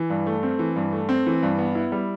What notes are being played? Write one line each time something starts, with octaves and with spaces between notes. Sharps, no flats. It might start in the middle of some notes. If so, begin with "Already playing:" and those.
Already playing: E3
G2
A3
C4
E3
G2
A3
C4
E3
G2
B3
E4
G3